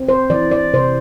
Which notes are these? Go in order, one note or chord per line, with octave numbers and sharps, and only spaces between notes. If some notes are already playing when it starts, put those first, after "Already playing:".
Already playing: C4
C5
E3 D5
D5
C3 C5